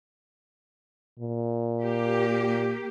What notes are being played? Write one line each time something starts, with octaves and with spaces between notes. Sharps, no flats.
A#2
A#3 G4